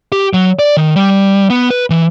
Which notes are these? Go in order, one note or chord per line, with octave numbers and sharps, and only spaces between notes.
G4
F#3
D5
D#3
G3
B3
B4
E3